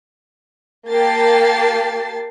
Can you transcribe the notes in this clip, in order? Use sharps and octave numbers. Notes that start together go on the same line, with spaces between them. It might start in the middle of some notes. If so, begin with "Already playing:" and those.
A#3 G4 G5 A5 A6 C7